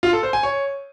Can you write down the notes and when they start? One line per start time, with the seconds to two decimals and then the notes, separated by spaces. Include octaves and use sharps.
0.03 F4
0.13 A4
0.23 C5
0.33 G#5
0.43 C#5